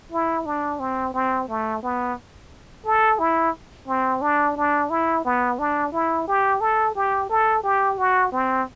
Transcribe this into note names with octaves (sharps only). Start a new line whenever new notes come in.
E4
D4
C4
C4
A3
B3
A4
E4
C4
D4
D4
E4
B3
D4
E4
G4
A4
G4
A4
G4
F#4
C4